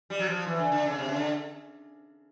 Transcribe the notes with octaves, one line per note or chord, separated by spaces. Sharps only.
G3
F#3
F3
E3
D3
D3
C#3
C3
C#3
D3